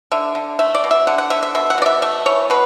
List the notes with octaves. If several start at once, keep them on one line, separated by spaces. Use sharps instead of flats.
D3 E5
D3
A3 E5
D5
B2
E5
D3 F#5
F#5
D3 E5
E5
B2 E5
F#5
B2 D5
E5
A3 E5
E3 C#5
B2 B4